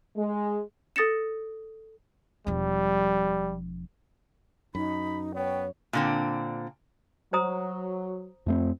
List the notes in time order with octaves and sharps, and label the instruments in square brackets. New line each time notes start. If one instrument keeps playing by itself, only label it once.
[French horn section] G#3
[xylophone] A4 D#6 A6 A#6 C#7 E7
[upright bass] E1 F3 [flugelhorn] G3
[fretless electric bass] F#2 [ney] D#4 [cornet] B5
[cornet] B3 [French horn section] C#5 [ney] G5
[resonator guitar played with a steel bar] A#2 D3 C4
[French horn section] F#3 [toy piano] C5 A#5 D#6
[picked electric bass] F2 A3 C4